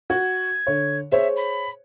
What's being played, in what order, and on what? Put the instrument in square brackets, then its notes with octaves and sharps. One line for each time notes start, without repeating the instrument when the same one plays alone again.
[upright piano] F#4 [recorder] G#6
[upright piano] D3 C#5
[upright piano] G#4 C5 C#5 [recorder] E5
[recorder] B5